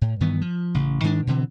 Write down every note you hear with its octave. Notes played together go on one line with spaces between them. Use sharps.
A2
G2 D#3 E3 B3
F3
A1 C#3
G#2 D#3 G#3 D4
B2 D3 E3 C4